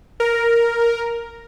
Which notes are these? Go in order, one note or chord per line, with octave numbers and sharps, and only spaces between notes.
A#4